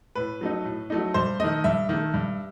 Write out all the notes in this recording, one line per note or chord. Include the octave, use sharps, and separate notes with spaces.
A2 B4
F#3 A3 D#4
A2
F#3 A3 D#4
G2 C5
D#3 A3 D#5
G2 E5
D#3 A3
G2